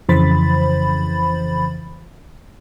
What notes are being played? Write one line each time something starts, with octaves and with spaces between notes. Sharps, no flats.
F2 C#3 E3 C5 B5 A6